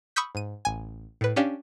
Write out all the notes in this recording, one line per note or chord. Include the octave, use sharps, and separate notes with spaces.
B5 C#6 D#6 E6 G6 B6
G#2 D#7
A1 G#5
A2 B4
C#4 D4 G4 F5